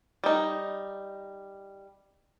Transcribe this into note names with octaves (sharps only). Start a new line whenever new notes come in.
G3 D#4